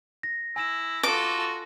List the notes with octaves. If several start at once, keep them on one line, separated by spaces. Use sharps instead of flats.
A#6
E4 G#5 A#6 E7
F4 F#4 A4 D6